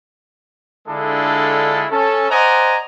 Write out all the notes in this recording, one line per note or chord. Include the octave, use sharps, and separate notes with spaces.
D3 G#3 D4 E4 F4 A4
C#4 A4
C5 D5 D#5 F#5 G#5 A#5